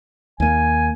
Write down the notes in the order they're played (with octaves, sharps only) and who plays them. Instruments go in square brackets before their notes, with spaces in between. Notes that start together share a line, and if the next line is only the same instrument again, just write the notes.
[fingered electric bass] D#2 A#3 [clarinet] G#5